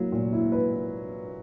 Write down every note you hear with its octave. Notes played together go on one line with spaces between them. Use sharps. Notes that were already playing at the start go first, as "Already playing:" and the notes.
Already playing: F#3 A#3 E4
A#2
E4
B4